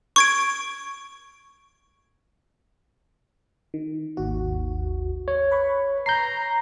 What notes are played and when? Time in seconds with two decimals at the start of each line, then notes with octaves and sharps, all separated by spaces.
0.16 C#6 G#6 D7
3.74 D#3
4.17 G#1 D#2 F#4
5.28 C#5
5.51 B4 B5 C#6
6.06 A#5 G6 C7